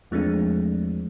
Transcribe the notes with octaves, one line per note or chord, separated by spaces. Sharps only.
E2 F3 G#3 A3 C4 D4